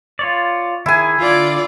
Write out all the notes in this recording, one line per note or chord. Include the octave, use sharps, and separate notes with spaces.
F4 C#5 D5
D#3 E4 G#4 G#5
D3 F4 D5